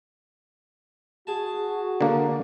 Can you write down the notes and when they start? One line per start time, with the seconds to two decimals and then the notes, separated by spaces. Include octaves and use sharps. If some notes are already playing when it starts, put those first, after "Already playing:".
1.27 F#4 G#4 A5
2.01 D3 A#3